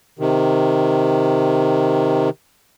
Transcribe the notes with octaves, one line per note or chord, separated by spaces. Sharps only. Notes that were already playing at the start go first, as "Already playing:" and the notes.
C3 D#3